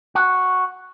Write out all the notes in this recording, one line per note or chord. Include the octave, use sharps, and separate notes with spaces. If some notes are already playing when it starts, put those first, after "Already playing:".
F#4